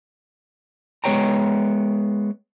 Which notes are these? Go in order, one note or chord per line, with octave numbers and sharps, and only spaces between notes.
G#3 B3 C5 C#5 G5 A#5